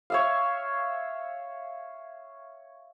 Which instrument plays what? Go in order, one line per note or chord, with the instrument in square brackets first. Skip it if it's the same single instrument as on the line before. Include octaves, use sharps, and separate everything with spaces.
[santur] C#5 E5 F5